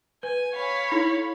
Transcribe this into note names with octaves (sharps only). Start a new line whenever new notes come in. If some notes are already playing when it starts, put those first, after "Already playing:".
B4 G#5
C#5 F5 B5
D#4 E4 A4